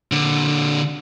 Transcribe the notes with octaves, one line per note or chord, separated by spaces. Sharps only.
A#2 D3